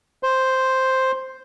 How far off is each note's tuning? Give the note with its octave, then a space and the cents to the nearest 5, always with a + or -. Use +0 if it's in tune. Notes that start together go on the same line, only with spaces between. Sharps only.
C5 +0